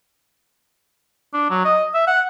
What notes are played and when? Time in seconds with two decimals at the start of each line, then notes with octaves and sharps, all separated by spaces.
1.33 D4
1.50 F#3
1.65 D#5
1.94 E5
2.07 F#5